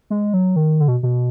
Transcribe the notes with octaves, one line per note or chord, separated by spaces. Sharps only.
G#3
F#3
D#3
D3
B2
B2